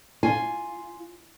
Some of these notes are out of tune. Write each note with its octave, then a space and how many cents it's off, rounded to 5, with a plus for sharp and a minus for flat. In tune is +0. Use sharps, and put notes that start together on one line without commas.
F4 +0 G#5 +0